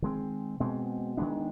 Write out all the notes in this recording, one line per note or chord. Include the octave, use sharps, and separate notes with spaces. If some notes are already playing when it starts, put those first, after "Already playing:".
D#3 G#3 C4
B2 G#3 C4
D#3 G#3 B3 D4